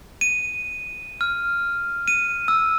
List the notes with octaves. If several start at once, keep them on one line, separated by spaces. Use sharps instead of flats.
D#7
F6
D#7
E6